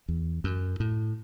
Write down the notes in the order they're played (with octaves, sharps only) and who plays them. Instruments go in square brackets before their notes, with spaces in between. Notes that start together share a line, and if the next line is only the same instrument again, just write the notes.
[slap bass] E2
F#2
A2